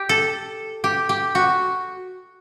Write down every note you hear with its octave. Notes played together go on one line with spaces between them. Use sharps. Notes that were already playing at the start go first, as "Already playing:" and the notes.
Already playing: G4
A4
G4
G4
F#4